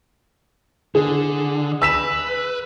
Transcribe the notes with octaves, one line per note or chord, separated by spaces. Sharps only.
D3 G#4
B4 E6 B6 E7